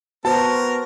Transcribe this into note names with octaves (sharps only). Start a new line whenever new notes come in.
B3 F#4 A#4 C5 A5